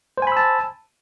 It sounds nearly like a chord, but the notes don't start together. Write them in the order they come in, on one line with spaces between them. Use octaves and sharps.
C5 G#5 B5 E6 A5